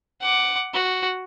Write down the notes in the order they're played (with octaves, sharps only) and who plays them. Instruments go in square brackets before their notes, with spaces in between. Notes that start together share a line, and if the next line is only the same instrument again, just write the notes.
[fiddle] F#5 D6
F#4